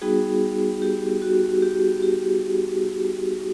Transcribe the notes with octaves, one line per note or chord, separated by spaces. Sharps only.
G3 B3 D#4 F#4 G#4
G4
F#4
G4
G4